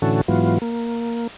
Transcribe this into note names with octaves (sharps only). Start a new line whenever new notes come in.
A2 D3 E3 C#4 F#4 A4
G#2 E3 F#3 B3 F4
A#3